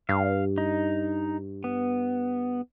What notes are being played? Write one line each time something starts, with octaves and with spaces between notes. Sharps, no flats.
G2 F5
D#4
B3